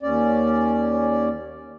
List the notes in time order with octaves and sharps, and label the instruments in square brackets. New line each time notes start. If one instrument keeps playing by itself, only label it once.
[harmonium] D#2 C#4 D5